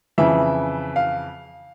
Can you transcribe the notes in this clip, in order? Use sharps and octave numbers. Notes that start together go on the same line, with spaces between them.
F2 C#3 E3 E5
F5